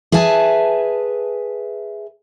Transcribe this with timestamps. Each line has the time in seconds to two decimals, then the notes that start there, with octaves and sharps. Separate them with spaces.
0.12 G#4 B4 E5 G#5 A5